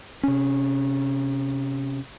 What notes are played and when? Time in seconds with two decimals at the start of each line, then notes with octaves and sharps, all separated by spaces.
0.23 C3 C#4